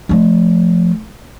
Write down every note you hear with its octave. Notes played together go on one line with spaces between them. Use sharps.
F3 A3